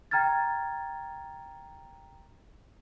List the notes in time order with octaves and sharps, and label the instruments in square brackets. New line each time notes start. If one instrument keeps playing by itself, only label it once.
[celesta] G5 A#5 F6 G#6 A6